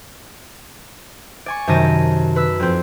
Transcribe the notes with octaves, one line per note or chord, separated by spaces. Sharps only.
D5 G#5 C#6
F#2 C3 D#3 A5 A#6 D#7
B4 B5 E6
F2 C4